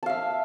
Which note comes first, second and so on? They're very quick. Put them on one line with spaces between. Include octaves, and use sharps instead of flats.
A5 F5 E5